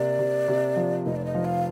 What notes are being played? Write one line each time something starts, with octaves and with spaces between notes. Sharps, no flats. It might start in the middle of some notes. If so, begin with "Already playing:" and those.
Already playing: C3 A#3 D5
C3
C3
F3
F1 D#5
D5
D#5
F3
F5